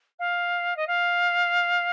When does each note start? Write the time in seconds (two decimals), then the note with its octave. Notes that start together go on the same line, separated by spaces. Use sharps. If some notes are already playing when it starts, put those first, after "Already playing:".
0.19 F5
0.76 D#5
0.87 F5